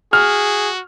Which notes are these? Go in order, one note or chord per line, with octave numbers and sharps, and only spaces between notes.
F#4 G#4 F6